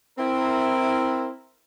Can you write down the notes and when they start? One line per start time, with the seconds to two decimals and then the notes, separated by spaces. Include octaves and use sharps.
0.18 C4 E4 A#4